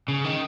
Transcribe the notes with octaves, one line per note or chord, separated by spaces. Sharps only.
C#3
D#3